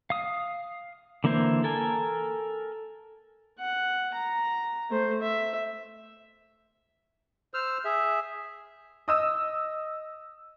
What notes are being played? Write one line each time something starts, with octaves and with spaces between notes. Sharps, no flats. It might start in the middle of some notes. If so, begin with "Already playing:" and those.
F5 D#6
D3 E3 A#3 E4 C5
A4 A#4 G#5
F#5
A#5
A3 C5
E5
C5 E6 F6
G#4 E5
D#5 D#6 E6